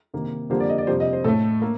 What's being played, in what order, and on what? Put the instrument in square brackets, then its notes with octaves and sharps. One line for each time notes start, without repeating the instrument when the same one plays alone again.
[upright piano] C3 D#3 A#3
F2 D3 G3 A#3 C5
D5
D#5
D5
F2 C3 G3 C5
D#5
C5
A2 A3 A4
A#3